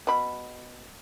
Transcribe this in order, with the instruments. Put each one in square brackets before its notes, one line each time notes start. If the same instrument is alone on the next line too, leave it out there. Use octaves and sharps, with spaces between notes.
[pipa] B2 B5